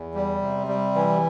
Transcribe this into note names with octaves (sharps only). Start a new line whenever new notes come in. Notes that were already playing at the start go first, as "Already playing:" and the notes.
Already playing: E2
G3
C3
G3
E3